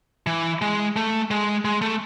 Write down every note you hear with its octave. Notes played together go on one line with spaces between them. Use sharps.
E3
G#3
A3
G#3
G#3
A3